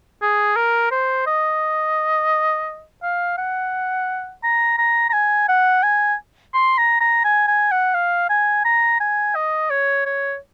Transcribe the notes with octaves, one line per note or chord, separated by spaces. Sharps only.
G#4
A#4
C5
D#5
F5
F#5
A#5
A#5
A#5
G#5
F#5
G#5
C6
A#5
A#5
G#5
G#5
F#5
F5
G#5
A#5
G#5
D#5
C#5
C#5